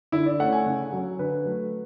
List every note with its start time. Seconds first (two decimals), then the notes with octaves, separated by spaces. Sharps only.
0.12 D3 E4
0.26 D5
0.39 A3 C#4 F#5
0.52 G#5
0.66 C#3
0.93 F#3 C#4
1.19 D3 B4
1.45 F#3 A3